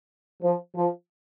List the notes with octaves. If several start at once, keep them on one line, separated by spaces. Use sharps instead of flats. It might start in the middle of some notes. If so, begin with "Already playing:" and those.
F3
F3